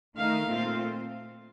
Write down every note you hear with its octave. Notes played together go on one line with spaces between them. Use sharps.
D#3 A3 D#4 F5
A#2 A3 C4 F4